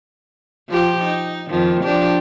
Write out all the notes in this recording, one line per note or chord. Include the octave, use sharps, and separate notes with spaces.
F3 F4 G4
D#4
F2 D#3 F3
F3 D4 G4